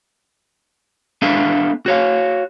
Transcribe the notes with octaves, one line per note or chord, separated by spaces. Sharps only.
B3 D4 A4 E5 F5
F#4 C#5 F5